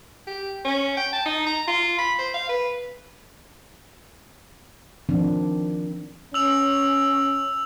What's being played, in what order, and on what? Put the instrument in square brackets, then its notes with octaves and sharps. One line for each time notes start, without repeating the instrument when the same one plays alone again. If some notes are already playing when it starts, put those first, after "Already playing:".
[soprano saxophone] G4
C#4
G5
A5
D#4
A#5
F4
B5
C5
F5
B4
[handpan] D#3 F3 C4 D4
[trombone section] C#4 [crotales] E6 F7